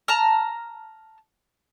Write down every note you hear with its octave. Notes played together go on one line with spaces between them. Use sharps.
A5 A#5 F6